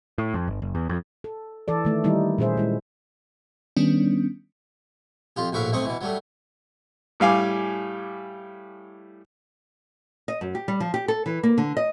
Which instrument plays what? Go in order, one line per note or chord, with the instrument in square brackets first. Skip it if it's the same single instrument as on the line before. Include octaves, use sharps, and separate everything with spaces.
[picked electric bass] A2
F2
G1
F#1
E2
F2
[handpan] A4
E3 A4 D5
D#3 A3
D#3 G3 A#3 D#4 E4
A#2 C#4 G#4 C5 E5
G#3 E4
[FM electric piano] D#3 G3 B3 C#4 D4
[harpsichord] F2 F4 G4
A#1 A2 F#4 E5 F5
B1 A3 C4 D#5 C#6
B2 E3
F#3 G3 A3
[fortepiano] A2 G3 F5 G#5 D6
[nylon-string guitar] D#5
F#2
G4
G3
F3
G4
A4
E3
A#3
D3
D#5